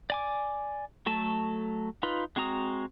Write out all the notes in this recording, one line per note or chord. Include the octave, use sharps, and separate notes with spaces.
D5 G#5 D6
F#3 A3 A4 A5
D#4 F4 B4
G#3 C4 F#4 A#5 D#6